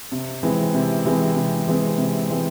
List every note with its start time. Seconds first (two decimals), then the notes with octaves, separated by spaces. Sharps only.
0.12 C3
0.43 E3 G#3 C4
0.74 C3
1.05 E3 G#3 C4
1.36 C3
1.68 E3 G#3 C4
1.98 C3
2.30 E3 G#3 C4